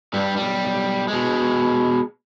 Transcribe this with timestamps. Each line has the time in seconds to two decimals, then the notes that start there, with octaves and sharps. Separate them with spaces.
0.14 G2 G3
0.36 B1 G3
1.08 B2 G#3